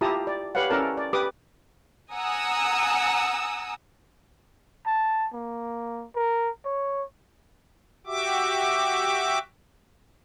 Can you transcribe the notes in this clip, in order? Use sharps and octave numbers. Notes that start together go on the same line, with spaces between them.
E4 F4 G4 A5 A#5 D#6
D5
G4 B4 C#5 F5 F#5
C#4 E4 A4 A#4 D5 A5
D5
G4 B4 D6 D#6
F#5 G#5 A#5 D#6 E6
A5
A#3
A#4
C#5
F#4 G4 E5 D6